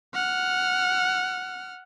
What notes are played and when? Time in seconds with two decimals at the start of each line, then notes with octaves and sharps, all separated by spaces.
0.14 F#5 F6